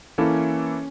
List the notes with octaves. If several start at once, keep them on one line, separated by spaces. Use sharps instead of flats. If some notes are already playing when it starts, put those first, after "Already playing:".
E3 A#3 C#4 E4 A4